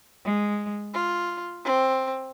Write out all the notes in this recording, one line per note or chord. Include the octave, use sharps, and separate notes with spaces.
G#3
F4
C4